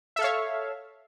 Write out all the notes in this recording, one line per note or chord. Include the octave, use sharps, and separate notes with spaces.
A4 C#5 E5 F5